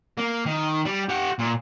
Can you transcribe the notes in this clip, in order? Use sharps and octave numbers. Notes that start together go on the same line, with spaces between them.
A#3
D#3
G3
G4 F#5
A#2